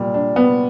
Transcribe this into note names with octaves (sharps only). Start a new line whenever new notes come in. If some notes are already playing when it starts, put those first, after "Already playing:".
Already playing: A#2 G3
D4
B3